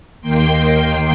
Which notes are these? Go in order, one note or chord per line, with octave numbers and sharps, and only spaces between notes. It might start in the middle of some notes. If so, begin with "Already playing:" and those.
D#2 D#3 A#3 G5 C6